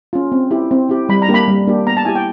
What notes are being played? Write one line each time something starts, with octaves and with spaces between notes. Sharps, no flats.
C#4 F4
C4
E4 G4
C4
E4 G4
G3 B5
A#5
A#3 D4 G4
B5
G3
A#3 D4 G4
B3 A#5
A5
E4 G4 G#5
G5